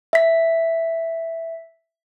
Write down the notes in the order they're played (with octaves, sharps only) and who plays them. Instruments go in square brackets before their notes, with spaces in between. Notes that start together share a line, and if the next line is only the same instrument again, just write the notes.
[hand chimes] E5 B6